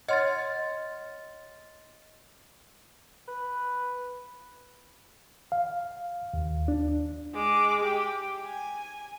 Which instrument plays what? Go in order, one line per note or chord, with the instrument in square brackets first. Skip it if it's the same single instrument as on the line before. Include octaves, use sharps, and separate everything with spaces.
[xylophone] C#5 F#5 F6 [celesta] D#5 C6 A6
[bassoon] B4
[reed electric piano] F5
D#2
D4
[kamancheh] G#3 D6
G4
G#5